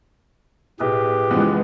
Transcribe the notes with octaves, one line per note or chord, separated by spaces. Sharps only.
B1 A2 G4 G#4 B4
F#1 E3 F3 G#3 B3